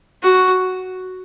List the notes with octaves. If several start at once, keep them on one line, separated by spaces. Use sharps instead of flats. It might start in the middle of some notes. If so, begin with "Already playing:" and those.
F#4